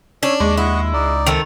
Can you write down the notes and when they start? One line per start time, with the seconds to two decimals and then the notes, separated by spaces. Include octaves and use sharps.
0.23 C#4 D4 C#5 E6
0.40 D#2 G#3 C#6 D6
0.58 E4 D#5 F#5 C#6
0.94 C#2 D#4 D5
1.27 D#3 A3 C4 F7